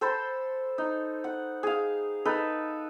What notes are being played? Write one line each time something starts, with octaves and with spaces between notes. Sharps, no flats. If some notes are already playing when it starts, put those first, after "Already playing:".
A4 C5 B5 C6
D#4
F#5
G#4 F5
D#4 A4 B4